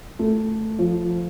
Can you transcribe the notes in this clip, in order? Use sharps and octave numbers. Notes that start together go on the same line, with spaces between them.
A3
F3